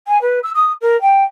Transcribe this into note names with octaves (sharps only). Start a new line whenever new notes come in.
G#5
B4
E6
D#6
A#4
G5